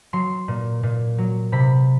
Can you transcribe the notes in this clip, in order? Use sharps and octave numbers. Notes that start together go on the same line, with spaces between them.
F#3 C6
A#2
A#2
F#3
C3 B5